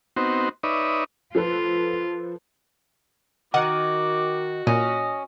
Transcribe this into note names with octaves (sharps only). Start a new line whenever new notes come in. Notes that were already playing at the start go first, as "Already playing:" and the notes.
B3 C4 D#4 F#4 C5
D#4 B4 C#5 D5 E5 D#6
F3 F4 A4 B4
D#3 F#4 F#5 D6
A#2 C#4 D#5